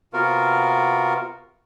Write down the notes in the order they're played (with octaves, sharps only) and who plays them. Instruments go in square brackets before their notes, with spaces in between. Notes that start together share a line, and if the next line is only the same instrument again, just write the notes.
[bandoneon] C3 B3 F4 F#4 A#4